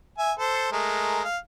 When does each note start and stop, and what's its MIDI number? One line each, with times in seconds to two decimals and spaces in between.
0.18 0.32 76
0.18 0.32 80
0.39 0.72 69
0.39 0.72 72
0.72 1.23 56
0.72 1.23 57
0.72 1.23 70
1.24 1.37 77